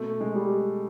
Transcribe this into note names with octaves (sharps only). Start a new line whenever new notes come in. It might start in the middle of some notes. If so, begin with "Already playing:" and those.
Already playing: B2 A3
G#3
G3